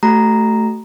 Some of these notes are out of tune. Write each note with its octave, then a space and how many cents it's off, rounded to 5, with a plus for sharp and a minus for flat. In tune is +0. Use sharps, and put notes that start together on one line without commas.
A3 +0 F#4 +40 A#5 +0